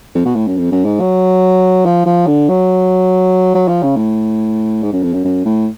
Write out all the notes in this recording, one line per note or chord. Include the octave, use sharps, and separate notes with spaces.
F2
B2
A2
F#2
F2
F#2
G#2
F#3
F3
F3
D3
F#3
F#3
F3
C#3
A2
G#2
F#2
F2
F#2
F#2
A2